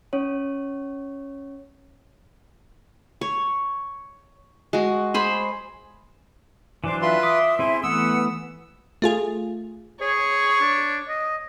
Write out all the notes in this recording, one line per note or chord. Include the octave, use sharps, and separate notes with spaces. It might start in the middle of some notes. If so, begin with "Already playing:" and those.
C#4 C#5
C#5
G#3 F#4
G#4 C5 B5
E3 F#3 D4 C5 D5 D6
F4 B4 E5 C6
D6 D#6
C4 E4 G#4 C6
E3 A3 B3 B4 F#5 D#6 E6
A3 F4 G#4
G#4 C#5
D4
D#5